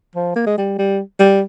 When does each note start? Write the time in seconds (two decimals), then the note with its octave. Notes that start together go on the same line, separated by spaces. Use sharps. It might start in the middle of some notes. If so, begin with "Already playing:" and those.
0.15 F3
0.36 A#3
0.47 G#3
0.58 G3
0.78 G3
1.19 G3